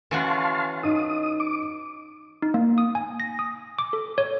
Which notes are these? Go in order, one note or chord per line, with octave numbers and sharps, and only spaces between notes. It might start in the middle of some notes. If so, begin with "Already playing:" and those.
E3 C#4 F#4 F5 A5 C6
D#4 D#6
D6
D#4
A#3
D#6
G#5
A#6
D#6
D6
A4
C#5